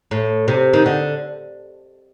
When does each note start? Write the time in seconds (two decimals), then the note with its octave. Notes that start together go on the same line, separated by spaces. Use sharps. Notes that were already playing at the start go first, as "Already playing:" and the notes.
0.11 A2
0.48 C3
0.73 D#3
0.86 D3